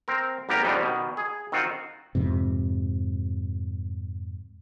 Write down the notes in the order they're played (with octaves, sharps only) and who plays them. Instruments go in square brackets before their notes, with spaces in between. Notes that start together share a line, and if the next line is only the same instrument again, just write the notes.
[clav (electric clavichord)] C4 A#4
G#1 A#3 B3 G4 A#4 A#5
F2 C#3 G3 B3 D4 D#4
B2 D#3
G#4
D#3 C4 F4 F#4
[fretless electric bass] F2 G#2 C3